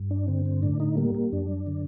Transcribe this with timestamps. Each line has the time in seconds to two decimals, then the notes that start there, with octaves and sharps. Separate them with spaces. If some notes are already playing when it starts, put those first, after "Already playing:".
Already playing: G2
0.11 D4
0.28 D3 C4
0.45 C4
0.62 A2 D4
0.80 D#4
0.97 G3 A#3
1.15 A#3
1.32 F#2 D4
1.67 D3